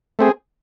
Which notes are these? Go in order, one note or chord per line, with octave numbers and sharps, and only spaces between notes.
A3 C4 G#4